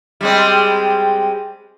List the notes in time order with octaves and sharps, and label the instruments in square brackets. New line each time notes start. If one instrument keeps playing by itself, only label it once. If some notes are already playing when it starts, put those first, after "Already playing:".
[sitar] G3 G#3 C4